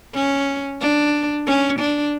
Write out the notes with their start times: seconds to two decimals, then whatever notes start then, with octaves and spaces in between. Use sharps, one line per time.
0.14 C#4
0.81 D4
1.47 C#4
1.79 D4